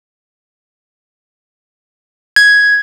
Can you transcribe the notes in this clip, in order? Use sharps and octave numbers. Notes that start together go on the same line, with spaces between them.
G#6